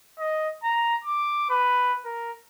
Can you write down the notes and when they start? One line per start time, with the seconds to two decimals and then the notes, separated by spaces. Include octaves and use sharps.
0.19 D#5
0.63 A#5
1.04 D6
1.50 B4
2.05 A#4